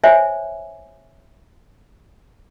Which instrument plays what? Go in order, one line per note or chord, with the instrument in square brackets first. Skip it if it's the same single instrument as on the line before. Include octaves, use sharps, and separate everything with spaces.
[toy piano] C5 C#5 E5 G#5